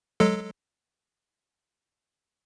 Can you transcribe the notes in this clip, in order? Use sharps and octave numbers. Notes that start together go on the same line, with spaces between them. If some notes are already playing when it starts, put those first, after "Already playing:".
F#3 G#3 A4